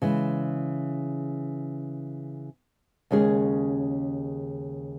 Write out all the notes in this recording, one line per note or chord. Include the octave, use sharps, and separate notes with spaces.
C#3 E3 G#3
D#2 C#3 G#3 C#4 G#4